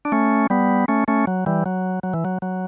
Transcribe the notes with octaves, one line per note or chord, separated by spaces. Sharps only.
D4
A3 C#4
G3 B3
A3 C#4
A3 C#4
F#3
E3 G3
F#3
F#3
E3
F#3
F#3